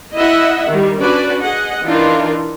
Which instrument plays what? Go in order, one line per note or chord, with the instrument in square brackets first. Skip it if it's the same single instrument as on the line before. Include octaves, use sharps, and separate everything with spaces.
[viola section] E4 D#5 E5 F#5
D#3 G3
C#4 D4 F#4 B4 D5
G#4 D#5 F#5
E3 D4 D#4 F4 A#4